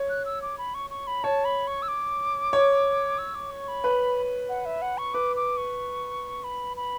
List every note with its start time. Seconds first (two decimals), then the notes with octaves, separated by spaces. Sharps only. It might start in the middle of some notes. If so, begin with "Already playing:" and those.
Already playing: C#5
0.09 F#6
0.25 E6
0.42 D6
0.58 B5
0.74 C#6
0.90 C#6
1.07 B5
1.24 C#5 A5
1.45 B5
1.67 C#6
1.82 E6
1.88 D6
2.53 C#5
3.18 E6
3.35 D6
3.51 C#6
3.68 B5
3.84 B4
4.49 F#5
4.65 E5
4.82 F#5
4.98 C#6
5.14 B4 D6
5.36 D6
5.57 C#6
6.44 B5
6.77 B5